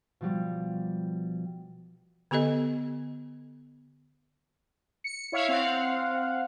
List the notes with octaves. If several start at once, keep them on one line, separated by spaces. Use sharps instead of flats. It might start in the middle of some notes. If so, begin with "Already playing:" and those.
B2 F3 G3
D3 B3 G4 A4 D#5
C#7
E4 C#5 E5 F5
C4 F5 F#5